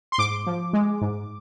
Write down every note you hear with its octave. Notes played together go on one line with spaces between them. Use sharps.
C6
G#2 D6
F3
G#3
G#2